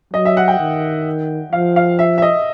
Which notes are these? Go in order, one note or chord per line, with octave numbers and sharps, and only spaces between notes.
F#3 D#5
E5
F#5
G5
D#3
F3 F5
F5
E5
E5
D#5